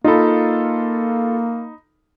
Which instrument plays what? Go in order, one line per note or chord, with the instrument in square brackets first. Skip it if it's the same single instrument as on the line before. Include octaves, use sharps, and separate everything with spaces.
[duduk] A#3 [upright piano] D#4 B5 [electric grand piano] F4 A4